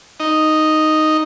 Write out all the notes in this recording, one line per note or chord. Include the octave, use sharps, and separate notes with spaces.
D#4